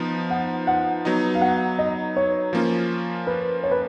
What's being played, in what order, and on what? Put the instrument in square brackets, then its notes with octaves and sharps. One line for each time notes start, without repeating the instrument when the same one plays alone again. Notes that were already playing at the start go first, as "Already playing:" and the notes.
Already playing: [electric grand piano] F3 B3 D#4
[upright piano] F#5
F#5
[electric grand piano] F#3 B3 D#4
[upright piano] F5
F#5
D#5
C#5
[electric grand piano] F3 A#3 C#4 F4
[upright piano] B4
C#5
B4